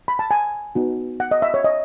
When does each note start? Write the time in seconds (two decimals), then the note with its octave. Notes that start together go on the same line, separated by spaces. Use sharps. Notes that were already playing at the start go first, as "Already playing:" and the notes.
0.08 B5
0.19 A5
0.31 G#5
0.75 B3 D#4 F#4
1.20 F#5
1.31 D#5
1.42 E5
1.54 C#5
1.64 D#5